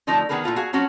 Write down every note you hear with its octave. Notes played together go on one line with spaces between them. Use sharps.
D3 F3 A3 D#4
D#3 B3 G#4 A#4 B4
A#2 E4 F4 A4
F#4 G#4 F5
F3 F#3 C#4 F#4 C#5